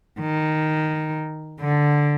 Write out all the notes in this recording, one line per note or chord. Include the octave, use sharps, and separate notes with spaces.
D#3
D3